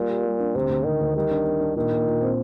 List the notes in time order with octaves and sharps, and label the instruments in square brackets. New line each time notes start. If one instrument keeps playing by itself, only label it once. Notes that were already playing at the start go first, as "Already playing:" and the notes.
Already playing: [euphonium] A#2 [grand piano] G3
[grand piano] G4
G3
D4
[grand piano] D2 [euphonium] C3
[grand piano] D2
[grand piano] D2 [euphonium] D#3
[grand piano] D2
[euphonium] D#3 [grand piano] G3
[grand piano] D4
D4
D4
[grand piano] A#2 [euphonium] D#3
[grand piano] A#2
A#2
C4